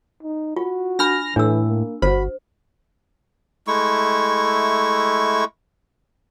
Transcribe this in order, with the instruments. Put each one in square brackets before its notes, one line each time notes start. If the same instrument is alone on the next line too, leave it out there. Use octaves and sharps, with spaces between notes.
[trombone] D#4
[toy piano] F4 [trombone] F#4
[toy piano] D4 B5 [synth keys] F6 A#6
[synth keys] A2 [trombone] E3 [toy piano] D4 E6
[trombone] A#3
[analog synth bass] G1 [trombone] F#4 [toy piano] C5 [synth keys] B5
[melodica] G#3 A3 E4 C#6